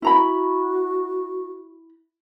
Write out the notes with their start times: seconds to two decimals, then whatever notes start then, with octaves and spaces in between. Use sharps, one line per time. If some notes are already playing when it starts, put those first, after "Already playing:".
0.02 E4 F#4 A#5 B5